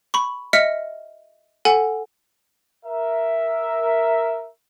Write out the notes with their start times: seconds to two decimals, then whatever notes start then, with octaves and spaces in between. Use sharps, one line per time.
0.14 B5 C#6
0.53 D#5 E5 F6 B6 C#7
1.65 A4 F#5 G#5
2.86 A#4 E5